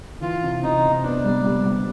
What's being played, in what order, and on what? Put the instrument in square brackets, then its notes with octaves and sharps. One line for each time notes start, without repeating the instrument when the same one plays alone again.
[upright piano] E3 [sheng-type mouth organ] F4
[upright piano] C3
[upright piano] C3 [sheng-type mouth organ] D#4
[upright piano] C3
[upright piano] B3 [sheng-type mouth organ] D4
[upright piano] G3
G3
G3